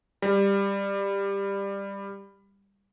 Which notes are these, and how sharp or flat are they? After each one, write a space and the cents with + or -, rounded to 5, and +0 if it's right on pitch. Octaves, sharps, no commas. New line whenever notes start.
G3 +15